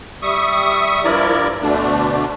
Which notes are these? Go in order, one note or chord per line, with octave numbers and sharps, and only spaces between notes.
G3 E5 C#6 D#6
G2 F3 E4 A#4 D5
D2 B2 D3 A3 D4